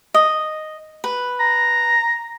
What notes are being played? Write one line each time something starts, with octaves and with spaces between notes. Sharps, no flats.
D#5
B4
A#5